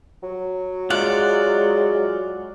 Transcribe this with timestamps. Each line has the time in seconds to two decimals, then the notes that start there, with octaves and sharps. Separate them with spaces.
0.23 F#3
0.90 G#3 F4 D5 F#5